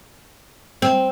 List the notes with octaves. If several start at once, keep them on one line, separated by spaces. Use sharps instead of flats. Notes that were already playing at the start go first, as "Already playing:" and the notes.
C4